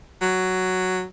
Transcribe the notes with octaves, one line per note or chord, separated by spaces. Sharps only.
F#3